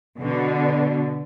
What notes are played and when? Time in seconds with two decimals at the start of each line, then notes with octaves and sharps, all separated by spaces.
0.20 B2 D3